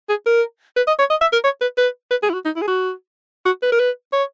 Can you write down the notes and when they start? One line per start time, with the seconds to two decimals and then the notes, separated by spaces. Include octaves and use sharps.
0.09 G#4
0.26 A#4
0.76 B4
0.87 D#5
0.99 C#5
1.10 D#5
1.21 E5
1.33 A#4
1.44 C#5
1.61 B4
1.77 B4
2.11 B4
2.23 G#4
2.30 E4
2.34 F#4
2.45 D#4
2.56 E4
2.62 G#4
2.68 F#4
3.46 F#4
3.62 B4
3.72 A#4
3.80 B4
4.13 C#5